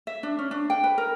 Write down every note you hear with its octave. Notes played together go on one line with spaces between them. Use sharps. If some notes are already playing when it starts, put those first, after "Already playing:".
E5
D4
C#4
D4
G5
B4
A#4